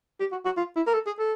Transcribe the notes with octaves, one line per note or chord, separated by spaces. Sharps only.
G4
F#4
F#4
F4
E4
A#4
A4
G#4
A4